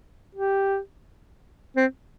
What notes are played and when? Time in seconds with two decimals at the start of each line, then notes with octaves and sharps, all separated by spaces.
0.35 G4
1.76 C4